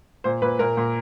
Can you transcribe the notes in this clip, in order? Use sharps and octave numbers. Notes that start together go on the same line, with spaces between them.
A#2 C5
A#2 B4
A#2 A#4
A#2